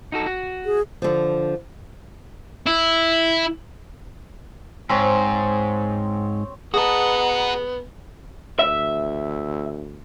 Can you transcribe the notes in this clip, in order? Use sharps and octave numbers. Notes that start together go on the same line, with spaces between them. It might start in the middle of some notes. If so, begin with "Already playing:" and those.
D#4 F#4 A4
F#4
G#4
D3 F3
E4
G#2 C4 C#5
B3 F#4 G#4 B4 D#5 F#5 A5 A#5
D2 E5